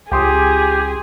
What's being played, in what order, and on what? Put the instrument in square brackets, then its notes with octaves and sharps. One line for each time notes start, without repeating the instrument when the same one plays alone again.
[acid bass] C#2 [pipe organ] G4 [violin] G#4 [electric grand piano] G5 C6 D#6